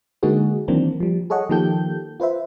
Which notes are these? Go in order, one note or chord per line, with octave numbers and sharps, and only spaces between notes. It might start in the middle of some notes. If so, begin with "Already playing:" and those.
D3 G#3 A#3 D#4 F#4 G#4
D#3 E3 F#3 A#3 C4 D4
F3 G3
G#4 A4 C#5 D#5 F#5
D#3 F3 A#3 G4 A4 G6
F4 B4 C5 E5